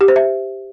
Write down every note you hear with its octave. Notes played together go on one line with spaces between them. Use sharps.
G4
C5
E5